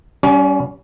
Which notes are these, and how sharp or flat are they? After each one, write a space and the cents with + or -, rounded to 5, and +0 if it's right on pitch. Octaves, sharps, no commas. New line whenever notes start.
G3 -25 C#4 +25